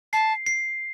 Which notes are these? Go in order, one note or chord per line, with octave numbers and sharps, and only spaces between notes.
A5 C7
C7